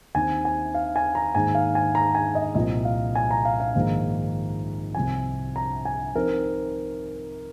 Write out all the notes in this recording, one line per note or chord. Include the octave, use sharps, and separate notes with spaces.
D#2 D#3 C4 G#5
G#5
F5
G#5
A#5
G#2 D#3 A#3 G#5
F5
G#5
A#5
G#5
D#5
C2 A#2 F3 C4 D#5
F5
G#5
A#5
F5
F5
A#1 G#2 D#3 A#3 D#4
C2 C3 F3 G#5
A#5
G#5
F3 C4 D#4 A#4